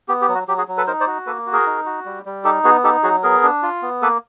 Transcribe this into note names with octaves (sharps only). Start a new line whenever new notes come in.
B3 G4
G4
F#3
F#4
F#3 G4
F#4 G#4
F#3
A4 B4
D#4 A#4 C5
C5 D5
F#4
A#3 A4 B4
F#4
G#4 A#4
D#4
F#4
G3
G3
D#4 G4 A4
B3 F#4 G#4
D#4 G4 A4
F#3 F#4 G#4
B3 G#4 A#4
D4
F4
B3
A#3 A4 B4